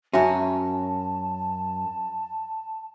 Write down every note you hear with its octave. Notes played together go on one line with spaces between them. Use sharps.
F#2 C#4 F#4 E5 G#5 A5